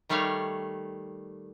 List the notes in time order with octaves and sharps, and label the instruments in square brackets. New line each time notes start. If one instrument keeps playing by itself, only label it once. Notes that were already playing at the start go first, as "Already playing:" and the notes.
[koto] D#3 G3 A3 C#5 F5